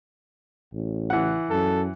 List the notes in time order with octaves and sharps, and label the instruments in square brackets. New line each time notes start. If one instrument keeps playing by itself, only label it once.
[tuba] A1
[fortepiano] E3 F#5
[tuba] F#2 [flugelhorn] A4